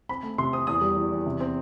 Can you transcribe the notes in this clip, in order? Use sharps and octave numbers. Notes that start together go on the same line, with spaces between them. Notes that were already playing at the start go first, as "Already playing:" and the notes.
C4 B5
A3
C3 C6
C4 D#6
E2 D#6
G3
E2
E2
C3
C4